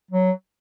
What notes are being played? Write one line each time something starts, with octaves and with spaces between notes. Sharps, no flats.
F#3